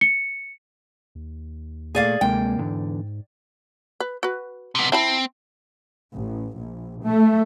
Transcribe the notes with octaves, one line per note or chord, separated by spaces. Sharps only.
C#7
D#2
A#2 A3 G#4 D5 F5
D2 C3 G#3 A#3 G5
E2 G#2 D3
B4
F#4 B4
C3 B3
C4 E4 A5 B5
A1
A#1
A3